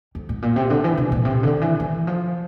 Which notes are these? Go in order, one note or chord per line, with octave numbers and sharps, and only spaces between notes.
F2
A2
A#2
C3
D3
E3
C3
A#2
C3
D3
E3
E3
F3